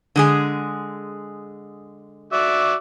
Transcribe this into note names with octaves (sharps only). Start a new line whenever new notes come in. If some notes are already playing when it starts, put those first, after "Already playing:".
D3 G#3 G#4
F#4 D5 E5